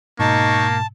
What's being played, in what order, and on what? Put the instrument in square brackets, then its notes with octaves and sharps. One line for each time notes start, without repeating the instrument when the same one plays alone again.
[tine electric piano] G#2 B2 [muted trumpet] A#3 [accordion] D#4 C#6 [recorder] A5